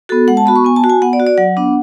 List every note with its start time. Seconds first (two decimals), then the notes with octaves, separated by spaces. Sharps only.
0.09 B3 F#4 A4
0.28 G#3 F#5
0.37 A5
0.46 B3 F#4 B5
0.56 C#6
0.64 B3 G#5
0.76 A5
0.84 F#4
0.90 G#5
1.02 B3 F#5
1.13 D5
1.20 F#4
1.27 D5
1.38 F#3 F#5
1.57 B3 D4